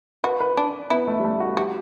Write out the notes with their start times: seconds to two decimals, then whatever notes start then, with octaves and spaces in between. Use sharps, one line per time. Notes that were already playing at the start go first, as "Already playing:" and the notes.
0.24 F#4 B4
0.40 B4
0.57 D4
0.90 B3 E4
1.08 A3
1.20 G3
1.24 A3
1.40 F#4
1.57 F#4 G4